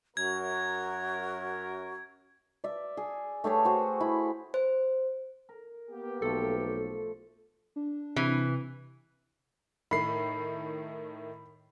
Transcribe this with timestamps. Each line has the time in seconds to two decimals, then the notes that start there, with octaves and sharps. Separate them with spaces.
0.17 F#2 F#4 A#4 G#6
2.64 D5 E5
2.97 G#4
3.44 A3 G4 G#4 C#5
3.65 F#4 C5
4.01 E4 B5
4.54 C5
5.49 A#4
5.90 A#3 B3 G4
6.22 B1 F3 A3 A4
7.76 D4
8.16 C3 E3
9.91 A2 D#3 B5 C7